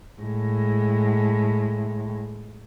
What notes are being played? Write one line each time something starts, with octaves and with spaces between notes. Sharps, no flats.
A2 G#3